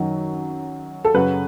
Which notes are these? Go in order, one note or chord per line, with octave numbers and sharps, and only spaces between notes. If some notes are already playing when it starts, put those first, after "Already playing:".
Already playing: F#2 D#3 F#3
A4
F#2 C#3 F#3 B4